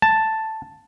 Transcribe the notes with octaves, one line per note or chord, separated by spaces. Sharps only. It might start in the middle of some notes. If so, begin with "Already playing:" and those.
A5